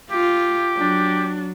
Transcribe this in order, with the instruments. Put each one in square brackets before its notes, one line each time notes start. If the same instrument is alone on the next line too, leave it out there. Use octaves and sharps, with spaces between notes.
[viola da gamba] F4 [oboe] G4
[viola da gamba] F#3 [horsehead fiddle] D4